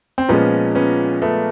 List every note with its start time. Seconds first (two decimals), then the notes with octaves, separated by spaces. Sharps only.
0.18 C4
0.29 A#2 F3 G#3 B3 C#4
0.75 B3 C#4
1.22 A3 B3